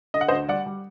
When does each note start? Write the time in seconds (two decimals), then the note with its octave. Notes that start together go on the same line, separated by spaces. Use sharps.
0.14 D3 D#5
0.21 F#5
0.28 C5 D#5
0.32 D2
0.49 G3 D5 F#5
0.66 G3